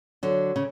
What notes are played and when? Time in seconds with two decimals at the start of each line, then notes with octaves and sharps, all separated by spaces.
0.23 D3 F#3
0.56 C#3